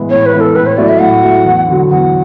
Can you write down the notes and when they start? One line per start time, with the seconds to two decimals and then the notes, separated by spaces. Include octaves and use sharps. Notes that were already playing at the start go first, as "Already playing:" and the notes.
Already playing: A2 E3 G#3 B3 E4
0.10 A2 C#5
0.26 B4
0.33 E3 G#3 B3 E4
0.40 A4
0.55 A2 B4
0.66 C#5
0.77 F#3 A3 E4 D5
0.89 E5
0.99 A2 F#5
1.22 F#3 A3 E4
1.44 E2
1.67 D3 F#3
1.90 E2 F#5